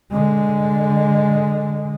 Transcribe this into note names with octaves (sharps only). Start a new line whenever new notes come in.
D3 G#3